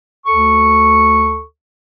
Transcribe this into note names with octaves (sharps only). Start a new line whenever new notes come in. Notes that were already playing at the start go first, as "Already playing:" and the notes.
D2 A4 C#6